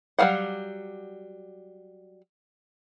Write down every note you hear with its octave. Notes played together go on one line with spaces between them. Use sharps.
F#3 G3 G#4 F5 F#5